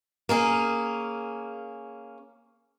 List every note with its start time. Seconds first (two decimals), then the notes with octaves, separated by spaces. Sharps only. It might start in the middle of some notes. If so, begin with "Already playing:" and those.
0.29 A#3 C#4 G#4